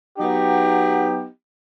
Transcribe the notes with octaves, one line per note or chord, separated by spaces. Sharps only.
F#3 B3 D#4 G4